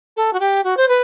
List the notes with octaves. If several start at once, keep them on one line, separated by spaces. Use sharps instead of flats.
A4
F#4
G4
F#4
C5
B4